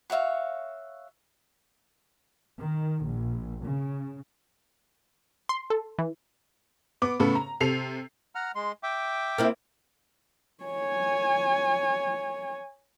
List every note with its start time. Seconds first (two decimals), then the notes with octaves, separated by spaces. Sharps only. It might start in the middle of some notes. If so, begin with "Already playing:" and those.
0.10 F#4 C#5 E5 F5
2.59 D#3
3.05 A#1
3.64 C#3
5.49 C6
5.70 A4
5.99 E3
7.02 B3 D6
7.20 A2 C#3 B3 A4
7.35 A#5
7.60 C3 A4 C7 F7
8.35 F#5 A#5 F6
8.55 G#3 C6
8.83 E5 G5 D6
9.38 A#3 C4 E4
10.64 C#5 G#5